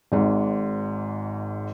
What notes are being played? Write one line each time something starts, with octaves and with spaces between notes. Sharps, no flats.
G#1 G#2